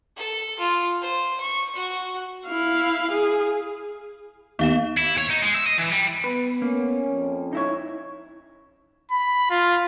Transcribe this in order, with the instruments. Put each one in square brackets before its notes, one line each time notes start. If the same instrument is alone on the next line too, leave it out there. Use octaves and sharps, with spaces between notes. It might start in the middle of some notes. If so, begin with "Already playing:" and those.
[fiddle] A4
F4
C5
C#6
F#4
[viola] E4 F5
G#4
[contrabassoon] D#2 [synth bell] B3 F5 E7
[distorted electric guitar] E4
C#5
D#4
G#3
E5
D#5
E3
G3
[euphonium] B3 [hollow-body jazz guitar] B4
[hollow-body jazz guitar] A#3 [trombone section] C#4
[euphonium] F2
[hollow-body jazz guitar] D#4 E4 C#5
[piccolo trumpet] B5
F4